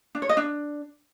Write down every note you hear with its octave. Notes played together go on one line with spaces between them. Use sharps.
D4
C#5
D#5
D4